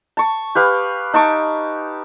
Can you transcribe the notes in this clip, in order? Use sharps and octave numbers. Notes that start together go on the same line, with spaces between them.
A5 C#6
G4 B4 F5 B5
D#4 A5 C#6 D6